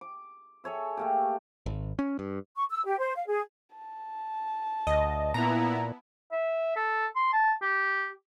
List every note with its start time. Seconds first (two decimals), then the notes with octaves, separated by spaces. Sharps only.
0.01 D6
0.64 G#4 A4 C#5 E5
0.97 A3 A#3 G4
1.66 G#1
1.99 C#4
2.19 G2
2.56 C#6
2.70 E6
2.85 G4
2.99 C5
3.16 F5
3.27 G#4
3.76 A5
4.87 D2 D#5
5.34 A#2 B3 E4 A#5
6.32 E5
6.76 A4
7.16 C6
7.33 A5
7.62 G4